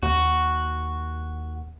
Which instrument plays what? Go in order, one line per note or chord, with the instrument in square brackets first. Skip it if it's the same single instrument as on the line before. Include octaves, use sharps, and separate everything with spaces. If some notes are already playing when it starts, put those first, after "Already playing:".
[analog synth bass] D#2 [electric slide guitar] F#4